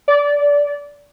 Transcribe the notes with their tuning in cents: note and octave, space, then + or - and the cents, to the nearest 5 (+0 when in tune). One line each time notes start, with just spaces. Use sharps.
D5 -20